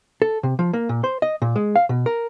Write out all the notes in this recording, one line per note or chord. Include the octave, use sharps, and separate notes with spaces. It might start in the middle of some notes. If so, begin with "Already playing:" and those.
A4
C3
F3
A#3
A#2
C5
D#5
A#2
G#3
F5
B2
A#4